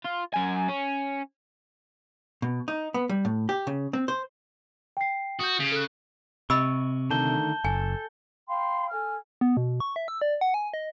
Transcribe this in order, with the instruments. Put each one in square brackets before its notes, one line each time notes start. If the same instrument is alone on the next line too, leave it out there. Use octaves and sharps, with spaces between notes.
[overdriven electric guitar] F4
F#2 G#5
C#4
[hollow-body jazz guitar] B2
D#4
B3
G3
A2
G4
C#3
C4
C5
[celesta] G5 C7
[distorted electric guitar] F#4 [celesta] D#6 G6
[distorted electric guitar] C#3
[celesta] A4 F#6
[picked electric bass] C3 [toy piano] D#5 B5 E6 [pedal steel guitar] C#6
[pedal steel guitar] D3 D#3 A3 [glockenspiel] A5 G6 G7
[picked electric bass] F#1 [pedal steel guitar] A4 [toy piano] G#5
[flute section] F5 G5 B5 C6
A4 G#5 F6
[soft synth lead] B3
B2
C#6
E5
E6
D5
F#5
G#5
D#5